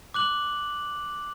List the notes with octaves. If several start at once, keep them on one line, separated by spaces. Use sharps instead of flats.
D6 F#6 F#7